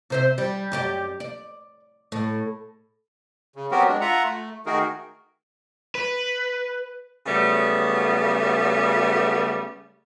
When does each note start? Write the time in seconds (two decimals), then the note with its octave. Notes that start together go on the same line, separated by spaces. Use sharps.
0.10 C3 C5 E5
0.38 G3
0.72 F#2 G4 D5
1.20 D5
2.12 A2
3.56 C#3
3.71 F#3 B3 C4 F#4 G4 A#4
3.88 G#3 D4
4.01 F4 E5 F#5 A#5
4.23 A3
4.66 D#3 A3 D#4 F#4 G#4 A#4
5.95 B4
7.26 C#3 F#3 G3 A3 B3